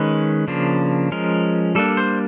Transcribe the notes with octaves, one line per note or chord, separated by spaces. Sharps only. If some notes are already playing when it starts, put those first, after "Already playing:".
Already playing: D#3 G#3 C#4 B4
C#3 F3 A#3 D4
F3 G#3 C#4 A#4
G3 A#3 D4 A4
C5